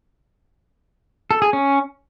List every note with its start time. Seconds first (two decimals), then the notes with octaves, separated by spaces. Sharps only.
1.31 A4
1.42 G#4
1.53 C#4